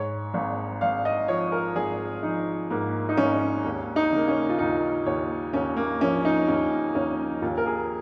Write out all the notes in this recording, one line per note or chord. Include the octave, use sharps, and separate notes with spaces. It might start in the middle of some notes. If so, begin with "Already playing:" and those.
Already playing: G#2 C#5
G#1
G#1 F5
D#5
F3 C#5
A#4
G#1 G#4
F3 D#4
G#2 A#3
D#4
G#1 C#4
D#2
D#4
C#3 A#3
C#4
F4
D#2 D#4
D#2 C#5
D#2 C#4
A#3
F3 C#4
D#4
D#2 C#4
D#2 C#4
D#2 F4
A#4
G#4